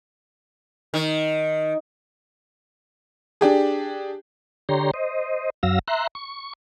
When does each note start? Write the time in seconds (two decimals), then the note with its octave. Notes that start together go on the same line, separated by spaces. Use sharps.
0.94 D#3
3.41 D4 G4 G#4
4.69 D3 G4 C#5 A#5 C6
4.94 C5 D#5
5.63 F#2 F#3 F5 E6 A#6
5.88 E5 A#5 C6 F#6
6.15 C#6